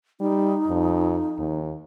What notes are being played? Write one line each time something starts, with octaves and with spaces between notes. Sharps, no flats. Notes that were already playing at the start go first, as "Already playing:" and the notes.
G3 D#4
F2
D#2